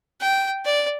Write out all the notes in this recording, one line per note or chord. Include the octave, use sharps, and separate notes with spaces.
G5
D5